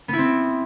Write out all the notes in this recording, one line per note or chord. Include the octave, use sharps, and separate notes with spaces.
B3 C4 E4